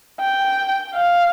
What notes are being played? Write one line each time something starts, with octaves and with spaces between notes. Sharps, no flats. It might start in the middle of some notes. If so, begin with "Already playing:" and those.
G5
F5